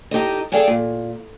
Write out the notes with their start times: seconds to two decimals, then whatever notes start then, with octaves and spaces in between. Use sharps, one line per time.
0.11 D#4 G4 A4 D#5
0.52 G#4 A4 D5 F5 G5 G#5
0.68 A#2